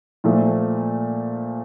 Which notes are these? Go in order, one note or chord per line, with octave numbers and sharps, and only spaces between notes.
A#2 F3 A3